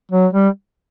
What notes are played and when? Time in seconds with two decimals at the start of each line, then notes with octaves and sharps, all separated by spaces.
0.12 F#3
0.33 G3